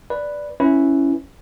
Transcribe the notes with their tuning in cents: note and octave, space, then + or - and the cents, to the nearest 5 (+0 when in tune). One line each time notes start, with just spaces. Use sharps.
B4 +0 D5 +0
C#4 +0 E4 +0 B4 +0